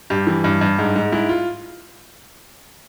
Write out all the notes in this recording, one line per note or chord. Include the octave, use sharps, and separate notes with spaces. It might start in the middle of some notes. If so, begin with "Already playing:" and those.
G2 G4
E3
G2
G2
G#2
G#2
G#2 E4
F4